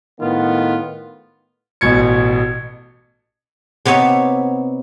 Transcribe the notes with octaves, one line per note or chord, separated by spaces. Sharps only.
A2 D#3 B3 F4
A1 B2 G#6 C#7
C3 B3 D#4 C#5 E5